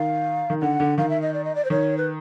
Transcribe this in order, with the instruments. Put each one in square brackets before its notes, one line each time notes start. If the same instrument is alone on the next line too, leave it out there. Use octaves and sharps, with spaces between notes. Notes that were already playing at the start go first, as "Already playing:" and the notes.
Already playing: [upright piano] D#3 [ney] F5
[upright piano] D#3
[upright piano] D3 [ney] F#5
[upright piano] D3
[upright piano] D#3 [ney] F5
[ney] E5
D#5
D5
D#5
D5
C5
[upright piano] D#3 [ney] C#5
[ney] B4